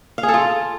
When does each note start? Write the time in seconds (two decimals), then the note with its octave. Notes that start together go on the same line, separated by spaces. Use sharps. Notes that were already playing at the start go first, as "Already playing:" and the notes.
0.18 F5
0.23 G#4
0.28 A4
0.34 F4